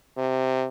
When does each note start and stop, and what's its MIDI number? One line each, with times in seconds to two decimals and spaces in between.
0.17 0.67 48